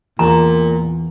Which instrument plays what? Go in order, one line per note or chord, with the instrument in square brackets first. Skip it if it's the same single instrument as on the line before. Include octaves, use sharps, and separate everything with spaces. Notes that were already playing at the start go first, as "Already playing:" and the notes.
[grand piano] E2 [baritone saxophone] A#2 [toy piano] A#5